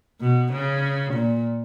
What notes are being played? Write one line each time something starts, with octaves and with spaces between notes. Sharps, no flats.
B2
C#3
A#2